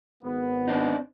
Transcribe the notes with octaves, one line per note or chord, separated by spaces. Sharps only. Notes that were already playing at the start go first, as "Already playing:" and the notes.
G#1 B3
C4 D4 D#4